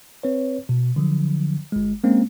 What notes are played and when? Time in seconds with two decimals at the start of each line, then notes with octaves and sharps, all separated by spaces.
0.23 C4 B4 C#5
0.69 B2
0.96 D3 F3 F#3
1.72 G1 G#3
2.04 G#3 A#3 C4 C#4